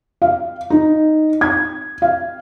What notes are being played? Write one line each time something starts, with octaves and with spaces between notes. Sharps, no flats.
F5
D#4
G#6
F5